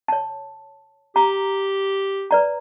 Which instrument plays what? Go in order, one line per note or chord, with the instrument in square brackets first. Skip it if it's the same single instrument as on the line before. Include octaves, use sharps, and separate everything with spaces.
[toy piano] C#5 A5
[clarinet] G4 [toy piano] A#5
[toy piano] B4 D5 A#5